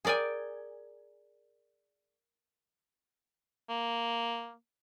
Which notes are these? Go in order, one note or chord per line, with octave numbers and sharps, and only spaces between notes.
G#4 A#4 D5 G5 G#5
A#3